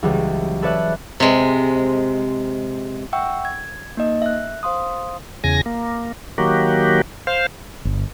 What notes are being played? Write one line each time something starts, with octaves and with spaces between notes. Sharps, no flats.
C#2 E3 F#3 G3
A4 B4 C#5 D5 E5 F#6
C3 G#3
E5 F#5 G5 C#6 E6
G#6
A#3 D#4 D#5
E5 F#6
C5 F5 C6 D#6
E2 C#3 G#5 A#6
A#3
D#3 F#3 A#3 F#4 G4
C5 F5
G1